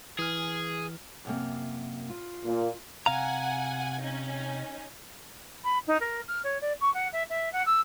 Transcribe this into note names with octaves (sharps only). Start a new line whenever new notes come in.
E3 G#4 F6
F#2 C3 A#3
F4
A#2
C3 F5 F#5 G#5 A#5
C#4 D#4
B5
D#4
A#4
F6
C#5
D5
C#6
F#5
E5
E5
F#5
E6